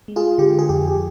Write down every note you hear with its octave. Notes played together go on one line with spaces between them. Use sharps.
G#3
F4 G#4
D3 G4
G#4
F2 G4
G4